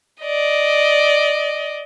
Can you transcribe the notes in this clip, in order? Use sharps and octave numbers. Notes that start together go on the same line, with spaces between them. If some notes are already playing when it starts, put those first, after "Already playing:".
D5 D#5